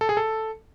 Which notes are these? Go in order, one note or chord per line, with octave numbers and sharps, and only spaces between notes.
A4
G#4
A4